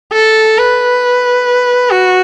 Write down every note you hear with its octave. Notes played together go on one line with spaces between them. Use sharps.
A4
B4
F#4